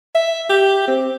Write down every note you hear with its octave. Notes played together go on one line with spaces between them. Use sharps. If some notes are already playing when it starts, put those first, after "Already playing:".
E5
G4
C4